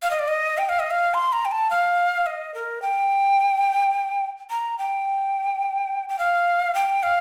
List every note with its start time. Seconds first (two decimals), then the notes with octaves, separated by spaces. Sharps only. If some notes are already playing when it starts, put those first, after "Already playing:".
0.02 F5
0.10 D#5
0.19 D5
0.28 D#5
0.58 G5
0.69 F5
0.79 D#5
0.90 F5
1.14 C6
1.32 A#5
1.45 G5
1.51 A5
1.70 F5
2.26 D#5
2.54 A#4
2.82 G5
4.50 A#5
4.78 G5
6.09 G5
6.18 F5
6.74 G5
7.03 F5